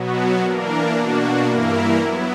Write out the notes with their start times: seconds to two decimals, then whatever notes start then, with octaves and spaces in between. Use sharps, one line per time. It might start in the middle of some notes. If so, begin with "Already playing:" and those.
Already playing: B2 F#3 B3 F#4
0.41 E3 A#3 D4 A#4
0.93 B2 A#3 D4 F#4
1.45 G2 E3 A#3 E4 A#4
1.98 F#3 B3 E4